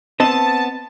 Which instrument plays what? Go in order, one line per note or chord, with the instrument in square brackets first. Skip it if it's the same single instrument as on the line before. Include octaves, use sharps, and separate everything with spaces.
[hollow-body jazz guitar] B3 C4 D#5 [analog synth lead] A5